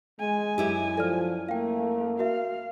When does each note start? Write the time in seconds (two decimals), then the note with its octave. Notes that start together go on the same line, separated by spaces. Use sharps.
0.20 G#3 G#5
0.58 F#2 E4 G4
0.97 F3 A4 D5 F6
1.49 A3 A#3 F5 G5
2.19 F#4 A#4 E5 F5